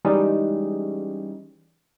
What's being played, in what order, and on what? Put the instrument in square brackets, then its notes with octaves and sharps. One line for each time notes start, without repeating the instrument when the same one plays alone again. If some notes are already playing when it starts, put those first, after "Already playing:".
[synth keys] E3 G3 G#3 C#4 D#4